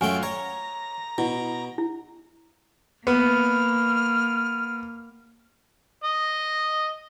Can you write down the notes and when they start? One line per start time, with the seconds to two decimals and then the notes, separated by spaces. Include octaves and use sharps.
0.01 F#2 F#3 A3 F4 G5 G#5
0.23 C#5 A#5
1.18 B2 E4
1.78 E4
3.07 A#3 B3 F6
6.04 D#5